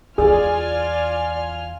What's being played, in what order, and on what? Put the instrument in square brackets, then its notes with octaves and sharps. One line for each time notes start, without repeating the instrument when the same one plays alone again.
[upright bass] E2 [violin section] F4 G#5 F6 [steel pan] G#4 [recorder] D5